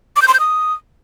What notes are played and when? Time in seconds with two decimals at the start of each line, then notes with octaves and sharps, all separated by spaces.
0.16 D6
0.22 G6
0.28 C6
0.34 G6
0.40 D#6